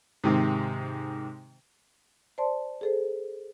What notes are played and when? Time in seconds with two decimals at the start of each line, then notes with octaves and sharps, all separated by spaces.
0.24 G#2 C3 D#3
2.38 C5 D5 A5 C6
2.81 G#4 A4 C5